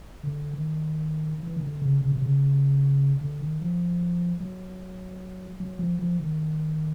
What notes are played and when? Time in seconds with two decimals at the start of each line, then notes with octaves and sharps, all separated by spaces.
0.23 D3
0.54 D#3
1.43 E3
1.56 D#3
1.63 D3
1.82 C#3
2.02 C#3
2.12 C3
2.22 C#3
3.21 D3
3.41 D#3
3.61 F3
4.40 F#3
5.60 F#3
5.79 F3
5.99 F3
6.20 D#3